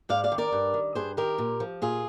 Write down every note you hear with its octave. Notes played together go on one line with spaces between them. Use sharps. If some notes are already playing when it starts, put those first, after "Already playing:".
G#2 D5 F5
D5 F5
D#3
A#4 D5
G2
D#3
G2 G#4 C5
D#3 G4 A#4
A#2
F3
A#2 F4 G#4